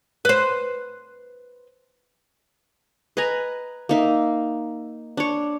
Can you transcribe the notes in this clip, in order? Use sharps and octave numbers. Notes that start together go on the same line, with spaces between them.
B4 C5
B4 D#5 G#5 A#5
A#3 D#4 E5
D4 C#5